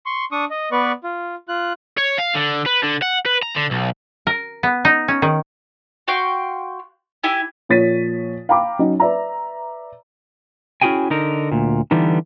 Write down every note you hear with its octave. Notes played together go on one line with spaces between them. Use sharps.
C6 C#6
D4 C#6 D#6
D#5
B3 B4 D5 C#6
F4
F4 F#6
C#5
F5
D3
B4
D3
F#5
B4
A#5
D3
B1
A#4
B3
D#4
C#4
D#3
F#4 F5 G5 C6
E4 G4 G#5
A#2 F3 C#5 A6 B6 D#7
F5 G5 A#5 B5 D6
F#3 C#4 D#4
B4 D5 E5 A#5
C#4 E4 F#4 G#4 G5 G#5
D3 D#4 A#4
D2 A#2
D3 E3 G3 B3 D#4